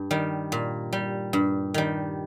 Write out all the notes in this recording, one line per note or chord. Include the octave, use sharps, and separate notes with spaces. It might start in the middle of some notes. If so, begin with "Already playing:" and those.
Already playing: G2
D#3 G3
A#2
G3
G2
D#3 G3